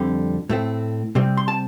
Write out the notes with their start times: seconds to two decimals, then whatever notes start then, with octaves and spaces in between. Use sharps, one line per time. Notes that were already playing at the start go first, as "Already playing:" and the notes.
Already playing: F2 D3 G3 C4
0.49 A2 A3 C4
1.15 C3 G3 C4
1.37 C6
1.48 A5